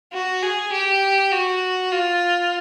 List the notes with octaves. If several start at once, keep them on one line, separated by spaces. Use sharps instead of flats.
F#4
G#4
G4
F#4
F4